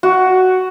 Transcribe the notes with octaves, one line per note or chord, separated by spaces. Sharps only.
F#4